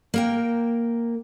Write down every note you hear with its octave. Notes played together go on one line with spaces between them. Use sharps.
A#3 A#4 G5